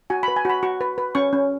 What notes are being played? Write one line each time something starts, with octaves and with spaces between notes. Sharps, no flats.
F#4 G#5
B5
B4
G#5
F#4 B5
F#4 C#6
B4
B4
C#4 C#6
C#4